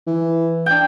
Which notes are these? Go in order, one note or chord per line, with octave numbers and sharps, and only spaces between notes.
E3
D4 G5